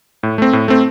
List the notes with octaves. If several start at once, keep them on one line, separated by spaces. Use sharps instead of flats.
A2
A3 C4
A2
A3 C4